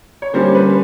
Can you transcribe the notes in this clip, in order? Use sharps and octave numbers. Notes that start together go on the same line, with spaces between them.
C#5
D3 G3 A#3 C#4 C5
C5
B4